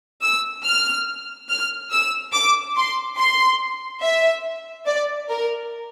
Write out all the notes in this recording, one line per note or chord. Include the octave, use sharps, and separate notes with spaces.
E6
F6
F6
E6
D6
C6
C6
E5
D5
A#4